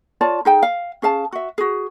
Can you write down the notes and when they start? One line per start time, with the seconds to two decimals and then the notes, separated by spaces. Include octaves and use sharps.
0.21 F4 C#5 D5 A5
0.45 D#4 G#4 G5
0.63 F5
1.02 C#4 G#4 F5 A5
1.32 F#4 E5
1.58 F#4 G#4